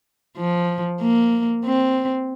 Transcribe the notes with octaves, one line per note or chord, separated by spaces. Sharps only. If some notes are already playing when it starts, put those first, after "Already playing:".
F3
A#3
C4